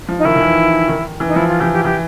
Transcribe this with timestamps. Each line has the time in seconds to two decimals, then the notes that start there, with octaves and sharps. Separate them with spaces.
0.09 F3
0.19 D#4
0.25 D#3 E4
0.36 D#3
0.40 E3
0.88 D#3
1.20 E3
1.27 D#4
1.36 F3 E4
1.49 F4
1.60 E3 G4
1.73 G4
1.84 E3 G4